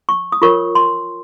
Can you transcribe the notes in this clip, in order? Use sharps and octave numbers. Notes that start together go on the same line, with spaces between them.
C#6
D#6
F4 A#4 C#5 C#6
C6